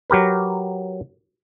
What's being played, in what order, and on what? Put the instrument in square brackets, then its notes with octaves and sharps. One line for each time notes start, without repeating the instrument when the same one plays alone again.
[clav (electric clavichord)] F#3 G4 A#4 B4